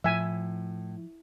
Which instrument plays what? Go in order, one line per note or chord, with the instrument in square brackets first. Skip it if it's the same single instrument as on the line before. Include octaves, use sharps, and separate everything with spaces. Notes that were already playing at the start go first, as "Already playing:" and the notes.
[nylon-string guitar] A2 [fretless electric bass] F3 [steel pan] E5 G#5